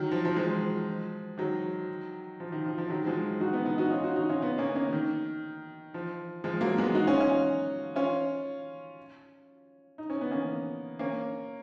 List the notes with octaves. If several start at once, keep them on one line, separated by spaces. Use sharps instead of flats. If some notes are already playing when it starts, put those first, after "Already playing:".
Already playing: D#3 F#3
F3
F3
F3 G#3
D#3 F#3
F3
D#3
F3
F3
D#3 F#3
F#3
F3 G#3
D#4 F#4
B3 D#4
B3 D#4
D#4 F#4
C#4 F4
D#4 F#4
D#4 F#4
C#4 F4
B3 D#4
A#3 C#4
A#3 C#4
D#3
F3
F3 G#3
F#3 A#3
G#3 B3
D#4 F#4
C#4 F4
C#4 F4
C#4 F4
D#4
C#4
B3
A#3 C#4
A#3 C#4